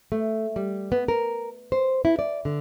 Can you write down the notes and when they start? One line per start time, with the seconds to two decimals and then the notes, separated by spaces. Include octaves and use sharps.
0.12 A3
0.56 G3
0.92 B3
1.08 A#4
1.72 C5
2.05 E4
2.19 D5
2.45 D3